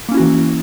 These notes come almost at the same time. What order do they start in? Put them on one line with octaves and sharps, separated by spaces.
A#3 C#4 E4 F#4 E3